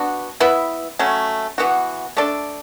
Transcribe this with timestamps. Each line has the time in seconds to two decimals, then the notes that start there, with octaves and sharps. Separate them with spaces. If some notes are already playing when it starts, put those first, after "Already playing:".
Already playing: B3 D4 F#4
0.40 B3 E4 B4 E5
0.99 F#3 A3 C#4
1.58 E3 B3 F#4
2.17 A3 D4 A4 D5